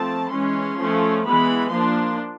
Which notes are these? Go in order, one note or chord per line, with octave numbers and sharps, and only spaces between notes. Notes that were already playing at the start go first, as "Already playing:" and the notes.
Already playing: F3 A3 C4 A5
E3 G#3 C#4 C6
F3 A3 C#4
E3 G#3 B3 B5
F3 A#3 D4 C6